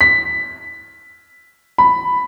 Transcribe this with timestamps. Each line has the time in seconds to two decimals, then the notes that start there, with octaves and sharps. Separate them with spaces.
0.01 B6
1.78 B5